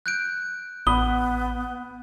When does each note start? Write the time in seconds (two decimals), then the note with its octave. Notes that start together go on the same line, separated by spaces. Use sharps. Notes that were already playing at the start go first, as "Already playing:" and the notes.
0.06 F#6 G6 D7
0.87 A1 B3 B5 D#6 G7